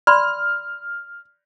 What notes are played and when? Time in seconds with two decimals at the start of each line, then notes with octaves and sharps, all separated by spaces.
0.07 D5 B5 C6 F6